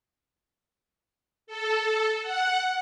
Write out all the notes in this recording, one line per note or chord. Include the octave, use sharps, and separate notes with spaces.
A4
F#5